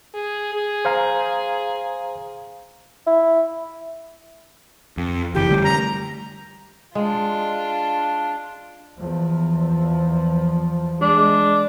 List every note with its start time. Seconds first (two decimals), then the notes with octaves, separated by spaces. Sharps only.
0.14 G#4
0.53 G#4
0.85 C5 F5 A#5
3.07 E4
4.97 F2
5.35 F#1 E3 G4
5.49 D3 G3 A3
5.64 A#5
6.95 G#3 D4 F4
8.98 E2 F3
11.01 G#3 D4